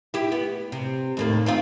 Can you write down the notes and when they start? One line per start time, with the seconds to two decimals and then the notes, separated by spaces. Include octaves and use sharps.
0.14 E4 G4
0.32 B3
0.72 C3
1.17 D#2 A2 A#3
1.46 C4 D#4 F4